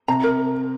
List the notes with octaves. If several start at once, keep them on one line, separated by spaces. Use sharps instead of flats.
C3 A#5
A#4